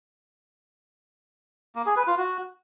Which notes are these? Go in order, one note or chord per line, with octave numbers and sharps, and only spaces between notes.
A#3
G#4
B4
F4
F#4